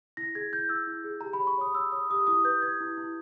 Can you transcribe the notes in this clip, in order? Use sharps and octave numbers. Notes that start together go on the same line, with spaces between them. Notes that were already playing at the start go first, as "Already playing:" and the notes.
E4 A#6
G#4 G#6
E4 G6
E4 E6
E4
G#4
G4 A#5
B5
C#5
C#6
C#5 D#6
C#5 E6
C#5 D#6
G4 D#6
E4 D#6
B4 G6
B4 G#6
E4
E4